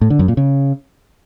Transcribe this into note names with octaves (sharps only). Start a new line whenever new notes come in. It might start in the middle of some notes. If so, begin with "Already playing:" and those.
A2
D3
F#2
A#2
C#3